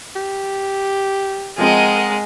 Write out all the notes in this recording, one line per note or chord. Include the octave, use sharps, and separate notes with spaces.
G4
F3 G#3 C4 A#4 D#5 F#5